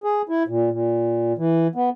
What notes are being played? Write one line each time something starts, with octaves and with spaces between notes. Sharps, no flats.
G#4
E4
A#2
A#2
E3
B3